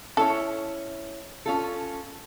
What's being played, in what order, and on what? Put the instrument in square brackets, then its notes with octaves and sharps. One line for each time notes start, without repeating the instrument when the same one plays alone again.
[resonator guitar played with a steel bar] C#4 E4 C#5 [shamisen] A4
[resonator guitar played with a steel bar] C#4 F4 A4